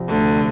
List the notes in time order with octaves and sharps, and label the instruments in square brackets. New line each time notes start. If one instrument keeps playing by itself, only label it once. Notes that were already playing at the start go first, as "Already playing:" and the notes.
Already playing: [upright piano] C2 C3 F3
[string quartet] D2 D3